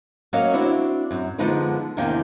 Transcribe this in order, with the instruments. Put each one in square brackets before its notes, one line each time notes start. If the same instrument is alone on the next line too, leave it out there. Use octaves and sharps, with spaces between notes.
[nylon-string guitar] F#3 A#3 C#4 D#5 F5
C4 D4 E4 F#4
F#2
D3 F3 G#3 B3 D#4 B4
E2 C3 D#3 A#3 D4 G5